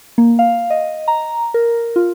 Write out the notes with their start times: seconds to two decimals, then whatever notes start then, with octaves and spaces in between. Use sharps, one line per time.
0.18 A#3
0.39 F5
0.70 D#5
1.08 A#5
1.54 A#4
1.96 F4